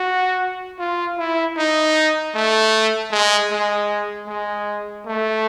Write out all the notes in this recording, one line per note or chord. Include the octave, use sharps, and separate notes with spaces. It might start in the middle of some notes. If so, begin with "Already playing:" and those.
Already playing: F#4
F4
E4
D#4
A3
G#3
G#3
G#3
A3